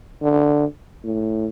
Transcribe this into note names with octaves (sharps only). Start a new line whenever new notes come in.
D3
A2